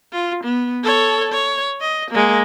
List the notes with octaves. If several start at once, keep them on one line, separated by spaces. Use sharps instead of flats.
F4
B3
A4 C#5
C#5
D#5
G#3 A#3